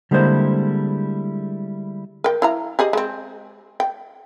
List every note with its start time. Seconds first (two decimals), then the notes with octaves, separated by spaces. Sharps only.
0.11 D3 G3 G#3 A#3 E4 C5
2.24 A#4 G5
2.42 E4 F5 A#5
2.79 G4 G#4 D#5
2.93 G#3 C4
3.80 G5